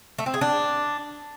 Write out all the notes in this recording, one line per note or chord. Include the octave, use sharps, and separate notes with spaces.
A3
C4
G#4
D4